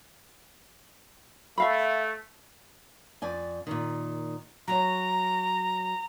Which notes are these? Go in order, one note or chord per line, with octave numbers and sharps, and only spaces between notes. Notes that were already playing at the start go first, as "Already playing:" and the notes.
A3 E5 F5 B5
F2 D5 G#5
A#2 D#3
F#3 C#5 A#5